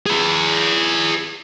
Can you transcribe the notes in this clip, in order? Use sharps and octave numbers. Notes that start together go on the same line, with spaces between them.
G#4 B4